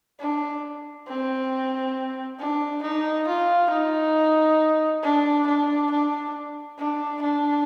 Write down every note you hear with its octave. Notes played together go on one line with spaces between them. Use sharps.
D4
C4
D4
D#4
F4
D#4
D4
D4
D4
D4
D4